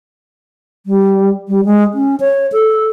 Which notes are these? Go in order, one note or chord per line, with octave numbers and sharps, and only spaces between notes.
G3
G3
G#3
C#4
C#5
A4